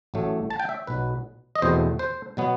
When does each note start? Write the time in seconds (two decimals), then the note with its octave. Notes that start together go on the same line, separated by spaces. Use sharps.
0.14 A1 A2 F#3 A3
0.50 A5
0.60 G5
0.69 E5
0.87 B1 B2 F#3 B4
1.55 D#5
1.62 E2 B2 A3 C4 C5
1.99 C5
2.37 B2 F#3 B3